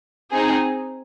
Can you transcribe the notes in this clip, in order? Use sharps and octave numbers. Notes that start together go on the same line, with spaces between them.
C4 D#4 G#4